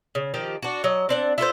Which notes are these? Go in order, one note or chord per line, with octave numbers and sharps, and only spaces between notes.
C#3
D#3 F3 G4
D4 F#4
F#3 D#5
C4 D4 F#5
E4 F4 A4 C5